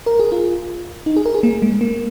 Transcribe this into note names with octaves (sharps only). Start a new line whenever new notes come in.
A#4
G#4
F4
D#4
G#4
A#4
G#4
A#3
G#3
A#3